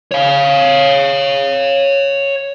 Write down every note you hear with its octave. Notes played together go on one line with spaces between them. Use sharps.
C#5 F5